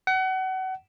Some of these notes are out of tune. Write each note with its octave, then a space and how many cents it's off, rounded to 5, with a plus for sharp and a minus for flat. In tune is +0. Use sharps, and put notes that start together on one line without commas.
F#5 +30